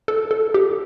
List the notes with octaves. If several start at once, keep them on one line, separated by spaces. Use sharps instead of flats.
A4
A4
G4